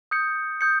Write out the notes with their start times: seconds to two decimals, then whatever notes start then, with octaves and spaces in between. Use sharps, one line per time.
0.11 D#6 G6 C#7
0.61 D#6 G6 C#7